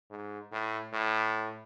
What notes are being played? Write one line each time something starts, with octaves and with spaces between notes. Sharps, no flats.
G#2
A2
A2